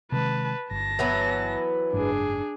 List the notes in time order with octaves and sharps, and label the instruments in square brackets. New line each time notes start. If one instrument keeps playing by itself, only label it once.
[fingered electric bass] C3 D#3 G#3 [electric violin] B4 A5
[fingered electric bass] G1 [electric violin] A5 A#6
[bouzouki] E3 F#3 B3
[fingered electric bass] F#1 G#2 [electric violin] D4 G#4